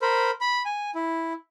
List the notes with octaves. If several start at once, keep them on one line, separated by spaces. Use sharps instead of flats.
A#4 C5 B5
B5
G#5
E4